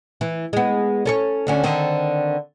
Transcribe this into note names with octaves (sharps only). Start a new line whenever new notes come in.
E3
G#3 B3
C#4 A4 C#5
D2 D3 C#4
D3 D#3 C4